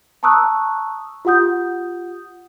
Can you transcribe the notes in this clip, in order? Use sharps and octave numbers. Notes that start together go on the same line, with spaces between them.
A5 A#5 C#6 D#6 E6 F#6
F4 G4 F#5 D#6 G6